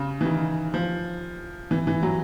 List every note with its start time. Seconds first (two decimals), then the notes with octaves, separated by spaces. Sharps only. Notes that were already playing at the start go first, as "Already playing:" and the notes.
Already playing: C#3
0.21 E3
0.25 D#3
0.74 F3
1.71 E3
1.87 E3
2.03 F#3